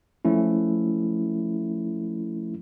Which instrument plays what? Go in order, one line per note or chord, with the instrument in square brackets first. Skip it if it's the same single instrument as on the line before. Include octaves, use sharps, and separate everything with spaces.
[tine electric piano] F3 A3 C#4 E4